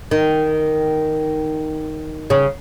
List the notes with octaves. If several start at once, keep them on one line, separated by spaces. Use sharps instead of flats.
D#3
C#3